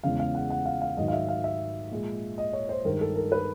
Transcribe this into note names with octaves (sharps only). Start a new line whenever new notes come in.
E2 C#3 E3 G#3 F5
F5
F#5
F#5
F5
F5
G#2 D#3 F#3 D#5
F5
E5
F5
E5
A#2 F3 G#3
D#5
C#5
C5
G2 D#3 G#3 A#4
A4
A#4
B4